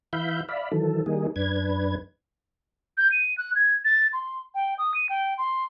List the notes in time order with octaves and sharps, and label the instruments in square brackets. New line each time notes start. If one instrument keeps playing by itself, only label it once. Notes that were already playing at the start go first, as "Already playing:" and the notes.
[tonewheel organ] E3 E5 F5 B5 G6
D5 E5 F5 B5
D#3 E3 F#3 A4
D#3 G3 A#3 D#4 G#4
F#2 D4 B4 G#6
[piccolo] G6
D#7
F#6
G#6
A6
C6
G5
D#6
D#7
G5
C6